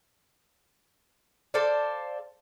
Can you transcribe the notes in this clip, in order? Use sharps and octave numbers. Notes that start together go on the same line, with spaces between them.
A4 C5 D5 F5